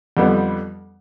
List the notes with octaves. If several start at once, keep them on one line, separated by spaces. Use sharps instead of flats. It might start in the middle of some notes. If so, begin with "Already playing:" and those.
F2 D3 G3 B3